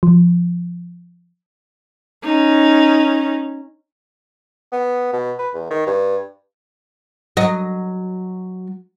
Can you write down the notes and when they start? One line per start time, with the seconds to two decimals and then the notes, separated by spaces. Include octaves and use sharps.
0.03 F3
2.24 C#4 D#4
4.72 B3
5.13 B2
5.39 B4
5.54 E2
5.71 D#3
5.87 G2
7.37 F#3 D#5